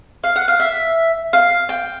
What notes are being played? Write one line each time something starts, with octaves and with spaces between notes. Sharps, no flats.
F5
F#5
F5
E5
F5
G5